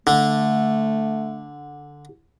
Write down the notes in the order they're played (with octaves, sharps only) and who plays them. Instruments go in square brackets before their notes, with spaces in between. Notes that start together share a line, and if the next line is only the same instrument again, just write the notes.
[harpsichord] D3 [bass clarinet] A3